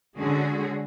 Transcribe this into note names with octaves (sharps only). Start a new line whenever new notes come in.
D3 G#3 C#4 F#4 G#4